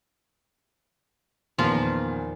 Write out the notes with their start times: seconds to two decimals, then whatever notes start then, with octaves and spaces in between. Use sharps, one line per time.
1.58 E2 A#2 D#3 F3 F4